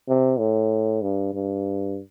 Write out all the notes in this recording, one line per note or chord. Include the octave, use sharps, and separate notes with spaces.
C3
A2
G2
G2